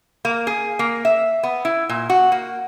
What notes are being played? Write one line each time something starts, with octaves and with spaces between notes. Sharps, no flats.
A#3
G#4
A#3
E5
B3
E4
A#2
F#4
A#3